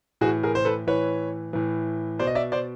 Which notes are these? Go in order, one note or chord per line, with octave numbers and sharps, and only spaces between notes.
A2 E3 F#4 G#4
G#4 A#4
C5
A4 B4
A2 E3 B4 C#5
A2 E3
B2 C5 D5
D#5
D5 E5
C5 D5